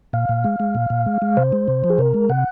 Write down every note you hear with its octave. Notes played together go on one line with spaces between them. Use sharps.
A#2 F5
A#2
G#3
G#3
A#2
A#2
G#3
G#3
C3 C5
G#3
C3
F3
G#4
C3 A#4
G#3
C3 F#5